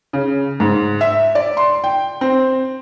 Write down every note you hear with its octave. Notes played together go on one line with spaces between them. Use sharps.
C#3
G#2
E5
D5
C6
G5
C4